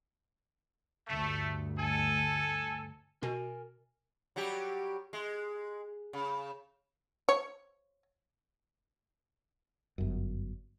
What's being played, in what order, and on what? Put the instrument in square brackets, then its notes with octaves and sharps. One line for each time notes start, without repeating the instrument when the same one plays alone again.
[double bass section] D2 G2 [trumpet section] A3
[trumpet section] A4 G#5
[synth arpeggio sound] B2 [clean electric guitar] A#4 G#5
[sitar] F#3 G3 G4
G#3
C#3
[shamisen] C#5
[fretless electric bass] G1 F#2